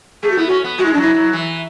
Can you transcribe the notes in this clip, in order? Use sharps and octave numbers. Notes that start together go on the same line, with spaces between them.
A3 G#4
F#4
B3 E4
C#4 F#4
B3
G#3 F#4
E4
D4
F#3
E4
F#3
E3